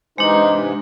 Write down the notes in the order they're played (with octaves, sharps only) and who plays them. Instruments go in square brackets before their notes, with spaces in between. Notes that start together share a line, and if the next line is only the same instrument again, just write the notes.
[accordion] G#2 C3 E3 [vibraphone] G#3 D4 [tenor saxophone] D#4 [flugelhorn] C5